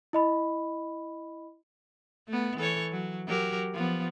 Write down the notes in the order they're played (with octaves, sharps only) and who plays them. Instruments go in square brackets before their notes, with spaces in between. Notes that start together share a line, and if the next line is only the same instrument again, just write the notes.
[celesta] E4 D#5 B5
[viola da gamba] A3 B3
E3 A4 C#5
F#3
F#3 G4 A#4
F3 B3